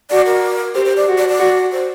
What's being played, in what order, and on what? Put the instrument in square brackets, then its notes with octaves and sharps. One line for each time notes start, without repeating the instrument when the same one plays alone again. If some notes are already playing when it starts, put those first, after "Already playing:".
[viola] F#4 [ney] D5
[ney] A#4
[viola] G4 [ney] C5
[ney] C5
D5
[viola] F#4
[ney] D5
D5
[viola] F#4
[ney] C5